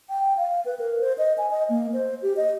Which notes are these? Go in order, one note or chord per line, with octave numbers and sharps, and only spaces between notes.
G5
F5
B4
A#4
C5
D#5
G#5
D#5
A#3
C5
G4
D#5